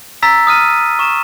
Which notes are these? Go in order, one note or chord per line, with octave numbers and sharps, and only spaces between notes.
A#5 E6 A6 B6
D#6 F6 D#7
C#6 E7